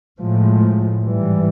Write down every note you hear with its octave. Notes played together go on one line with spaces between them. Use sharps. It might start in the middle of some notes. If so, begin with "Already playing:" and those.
A2 F3 G#3
G#2 E3 G3